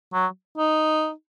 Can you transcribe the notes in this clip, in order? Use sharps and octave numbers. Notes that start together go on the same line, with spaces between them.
F#3
D#4